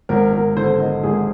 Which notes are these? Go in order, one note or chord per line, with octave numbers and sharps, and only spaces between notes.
G#1 A#4
G#1 A#4
D3 C5
D3 D#5
G#1 G#4